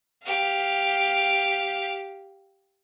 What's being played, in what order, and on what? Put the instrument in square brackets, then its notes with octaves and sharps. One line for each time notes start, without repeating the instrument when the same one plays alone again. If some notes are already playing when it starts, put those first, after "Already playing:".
[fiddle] G4 F5